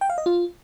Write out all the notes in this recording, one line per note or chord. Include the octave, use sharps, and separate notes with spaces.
G5
F5
D#5
F4